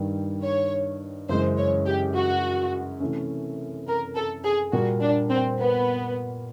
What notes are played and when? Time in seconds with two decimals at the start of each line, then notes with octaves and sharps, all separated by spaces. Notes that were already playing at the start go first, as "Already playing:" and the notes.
Already playing: G2 D#3 G3
0.44 C#5
1.29 F#2 C#3 E3 G#3 C5
1.57 C#5
1.86 G4
2.14 F#4
3.00 C3 E3 A3 C#4
3.87 A#4
4.15 A4
4.45 G#4
4.72 A#2 G3 A#3 F#4
5.01 D4
5.30 C4
5.58 B3